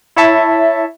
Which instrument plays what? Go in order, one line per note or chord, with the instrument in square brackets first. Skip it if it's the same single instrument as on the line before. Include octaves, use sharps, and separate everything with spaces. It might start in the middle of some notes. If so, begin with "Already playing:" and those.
[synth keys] E4 C#5 E5 A5